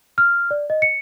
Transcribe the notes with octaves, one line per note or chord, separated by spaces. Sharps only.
F6
D5
D#5
C#7